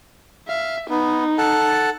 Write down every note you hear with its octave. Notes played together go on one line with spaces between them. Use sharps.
E5 F5
B3 D#4
A4 F#5 A5